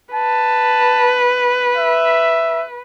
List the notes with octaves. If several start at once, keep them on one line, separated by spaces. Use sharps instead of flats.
B4 A5
E5